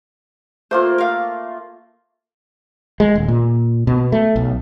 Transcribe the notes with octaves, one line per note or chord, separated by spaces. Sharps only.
A3 A#3 F4 C5
A#4 F5
G#3
D#1
A#2
B2
A3
B1